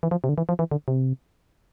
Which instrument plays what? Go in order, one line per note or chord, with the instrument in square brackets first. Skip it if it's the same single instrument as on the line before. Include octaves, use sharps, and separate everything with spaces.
[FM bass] E3
F3
C3
D3
E3
F3
E3
D3
C3